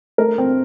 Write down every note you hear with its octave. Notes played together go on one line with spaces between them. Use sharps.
A3 A#4
C4